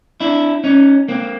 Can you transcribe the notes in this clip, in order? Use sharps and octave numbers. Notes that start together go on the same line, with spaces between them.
D4 E4
C#4 D#4
A#3 C4